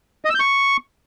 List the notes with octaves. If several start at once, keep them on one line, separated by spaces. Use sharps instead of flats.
D#5
E6
G6
C#6